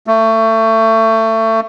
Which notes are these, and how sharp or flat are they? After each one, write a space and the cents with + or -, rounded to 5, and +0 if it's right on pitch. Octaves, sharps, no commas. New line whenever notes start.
A3 +25